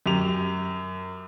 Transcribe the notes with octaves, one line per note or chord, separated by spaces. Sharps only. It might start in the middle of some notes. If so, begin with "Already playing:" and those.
F#2 G4 F7